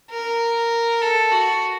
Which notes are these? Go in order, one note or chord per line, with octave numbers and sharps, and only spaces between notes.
A#4
A4
F#4